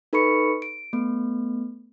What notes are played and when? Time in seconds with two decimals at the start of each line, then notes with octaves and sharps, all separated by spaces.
0.13 D#4 A4 B4 B5 C#6 C#7
0.62 D7
0.93 A3 B3